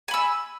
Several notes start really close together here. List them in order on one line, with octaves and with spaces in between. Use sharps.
G#5 B5 E6